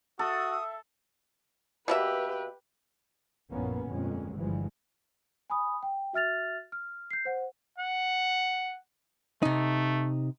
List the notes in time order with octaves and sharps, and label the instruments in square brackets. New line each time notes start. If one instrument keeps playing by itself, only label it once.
[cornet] F#4 [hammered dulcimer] A4 [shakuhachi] E5 [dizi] D#6
[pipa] B2 A#3 E5 [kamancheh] G4 B4
[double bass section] A#1 F#2 A2 A#3 B3 C#4
G1 F2 A#2 G#3 C#4
G1 G2 E3 F3 G#3
[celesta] G#5 B5 D#6
G5
F#4 E5 F6 A6 F7
F6
G6 C7
C5 F#5
[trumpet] F#5
[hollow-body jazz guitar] C3 D#4 [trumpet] A3